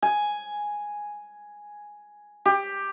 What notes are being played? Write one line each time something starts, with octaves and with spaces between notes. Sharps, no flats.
G#5
G4